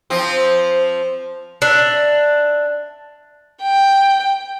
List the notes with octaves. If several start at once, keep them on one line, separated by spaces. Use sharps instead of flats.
F3 C4
D4 E5
G5